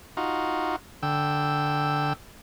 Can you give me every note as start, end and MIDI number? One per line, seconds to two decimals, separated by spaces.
0.17 0.76 63
0.17 0.76 65
0.17 0.76 66
1.03 2.13 50
1.03 2.13 79
1.03 2.13 88